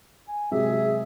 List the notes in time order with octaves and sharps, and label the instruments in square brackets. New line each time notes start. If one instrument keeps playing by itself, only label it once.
[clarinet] G#5
[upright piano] C3 F#3 G#3 [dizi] G#4 [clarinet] E5